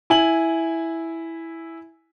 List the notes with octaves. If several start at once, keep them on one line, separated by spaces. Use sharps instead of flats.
E4 G#5 F#7